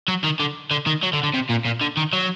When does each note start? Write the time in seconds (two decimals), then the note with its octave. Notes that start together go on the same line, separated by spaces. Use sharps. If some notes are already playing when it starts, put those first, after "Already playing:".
0.08 F#3
0.24 D#3
0.40 D3
0.71 D3
0.86 D#3
1.03 F#3
1.13 D3
1.23 D3
1.34 C3
1.50 A#2
1.65 A#2
1.81 D3
1.97 D#3
2.13 F#3